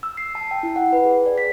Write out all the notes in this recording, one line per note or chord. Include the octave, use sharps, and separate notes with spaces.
E6
C7
A5
G5
E4
F#5
B4
G#4
D5
B6